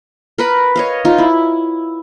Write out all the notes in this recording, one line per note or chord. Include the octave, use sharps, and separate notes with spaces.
A#4 B4 B5
C#5 D#5 F5
D#4 F4
E4